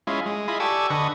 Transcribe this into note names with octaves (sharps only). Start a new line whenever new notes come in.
G#3 C#4 E4 F4
G#3
E4 F4 G#4 D#5 B5
G4 A4 D5 G#5 C#6 E6
D3 B4 D#5 C#6